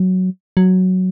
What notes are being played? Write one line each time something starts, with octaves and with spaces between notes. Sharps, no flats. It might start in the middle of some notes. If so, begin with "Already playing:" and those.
Already playing: F#3
F#3